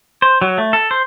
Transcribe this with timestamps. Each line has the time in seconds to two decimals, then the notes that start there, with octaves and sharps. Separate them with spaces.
0.22 C5
0.42 F#3
0.58 A3
0.73 A4
0.91 C5